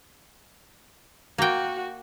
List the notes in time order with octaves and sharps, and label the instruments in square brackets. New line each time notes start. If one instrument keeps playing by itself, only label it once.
[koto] A#3 G5 [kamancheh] F#4